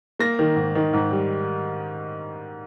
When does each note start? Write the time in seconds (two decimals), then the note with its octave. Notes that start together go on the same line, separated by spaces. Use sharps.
0.19 A#3 A#6
0.39 D#3
0.56 G#2
0.75 D#3
0.93 G#2
1.11 G3